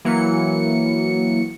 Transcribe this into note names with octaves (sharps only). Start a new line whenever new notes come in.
E3 F#3 A#3 C#7